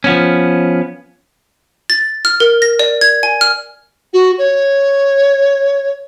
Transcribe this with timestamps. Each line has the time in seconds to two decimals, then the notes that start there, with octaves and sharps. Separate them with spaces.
0.04 F3 B3 C#4
1.90 A6
2.25 F6
2.40 A#4
2.62 A#6
2.79 D5
3.01 G#6
3.23 G#5
3.41 F6
4.13 F#4
4.38 C#5